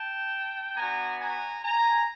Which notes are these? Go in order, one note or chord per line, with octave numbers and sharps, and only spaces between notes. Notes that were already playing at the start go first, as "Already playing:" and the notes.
Already playing: G5 A5
B3 D4 F#4 G#5 A#5
G#5 A#5
G#5 A#5